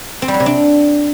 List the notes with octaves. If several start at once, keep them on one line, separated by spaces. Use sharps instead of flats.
C4
G3
F#3
C3
D4